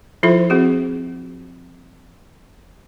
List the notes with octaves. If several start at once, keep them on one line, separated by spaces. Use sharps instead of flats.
F3 E4 F4 A4 C5 E5
C4 F#4 G#4